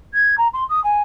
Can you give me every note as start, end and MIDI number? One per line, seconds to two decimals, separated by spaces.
0.13 0.35 92
0.37 0.48 82
0.53 0.64 84
0.69 0.82 87
0.84 1.02 80